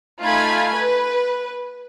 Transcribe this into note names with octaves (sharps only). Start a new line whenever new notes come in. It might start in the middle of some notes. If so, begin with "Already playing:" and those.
A3 D#4 F4 G#5 B5 G#6
B4